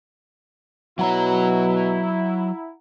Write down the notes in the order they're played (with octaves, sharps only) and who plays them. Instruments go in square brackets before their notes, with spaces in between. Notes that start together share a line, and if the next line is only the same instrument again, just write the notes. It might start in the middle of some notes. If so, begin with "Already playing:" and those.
[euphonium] B2 [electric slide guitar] F#3 C#5 [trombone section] E4 [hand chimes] F#5 A#5